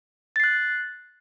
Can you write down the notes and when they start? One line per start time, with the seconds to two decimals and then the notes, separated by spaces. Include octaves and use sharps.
0.36 A6
0.40 C7
0.44 F#6